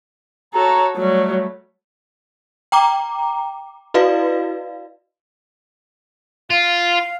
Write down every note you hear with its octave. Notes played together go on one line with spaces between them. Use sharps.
F#4 A4 C#5 A#5
F#3 G3 A3
G5 A#5 D6
E4 F#4 B4 D5 D#5 F5
F4 F5